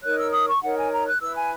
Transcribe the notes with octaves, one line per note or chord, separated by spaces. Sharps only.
D#4 A#4 C#5 F#6
E6
D#6
C#6
D#4 A#4 C#5 F#5
G#5
A#5
F#6
E4 B4 E6
G#5